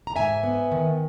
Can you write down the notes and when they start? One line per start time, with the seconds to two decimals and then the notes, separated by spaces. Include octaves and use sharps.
0.07 A#5
0.16 G#2 E5 G#5
0.43 B3
0.72 D#3